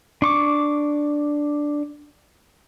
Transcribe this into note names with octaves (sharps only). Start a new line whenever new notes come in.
D4 C#6 D6